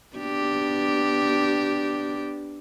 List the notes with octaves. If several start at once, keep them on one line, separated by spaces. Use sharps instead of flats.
B3 D4 G4